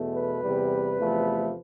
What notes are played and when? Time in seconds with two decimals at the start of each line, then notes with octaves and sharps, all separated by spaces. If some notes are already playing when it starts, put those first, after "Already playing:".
Already playing: E2 B2 A3
0.12 B4
0.41 E2 C3 G3
0.98 E2 C3 F3 A3